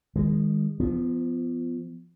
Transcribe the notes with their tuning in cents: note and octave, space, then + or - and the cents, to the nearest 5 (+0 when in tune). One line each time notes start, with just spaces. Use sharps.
D#3 +0 G#3 -30
F3 -20 B3 +25